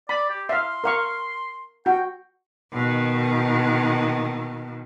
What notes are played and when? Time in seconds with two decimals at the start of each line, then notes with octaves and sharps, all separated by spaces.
0.09 D5 B5
0.29 G4
0.49 E5 F5 C6
0.84 A#4 F5 C#6
1.86 F#4 G5
2.73 B2 D#3